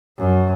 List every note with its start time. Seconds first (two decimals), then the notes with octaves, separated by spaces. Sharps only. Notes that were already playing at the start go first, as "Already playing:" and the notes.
0.18 F#2